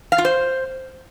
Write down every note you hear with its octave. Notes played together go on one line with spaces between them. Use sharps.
F5
F4
C5